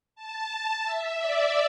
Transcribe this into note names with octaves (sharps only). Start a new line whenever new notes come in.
A5
E5
D5